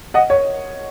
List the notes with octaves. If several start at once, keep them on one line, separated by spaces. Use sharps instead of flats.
D#5 F#5
C#5